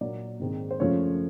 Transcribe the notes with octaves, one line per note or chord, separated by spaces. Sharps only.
A#2 F#3 A#3 D5
G#2 D#3 G#3 C4
C5
F#2 C#3 F3 A3 C#5